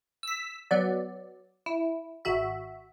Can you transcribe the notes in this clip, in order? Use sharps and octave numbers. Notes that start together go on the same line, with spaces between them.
E6 B6
F#3 B3 D5
E4
G#1 F#4 E5